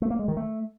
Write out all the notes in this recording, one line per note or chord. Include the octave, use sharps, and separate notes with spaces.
A3
A#3
G#3
D#3
A3